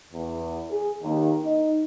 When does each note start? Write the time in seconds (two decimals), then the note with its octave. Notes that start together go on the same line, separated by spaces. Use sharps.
0.13 E2
0.70 G#4
1.03 D#2
1.44 D#4